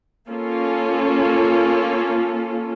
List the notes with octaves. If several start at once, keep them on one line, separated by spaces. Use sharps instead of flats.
A#3 C#4 F4 A4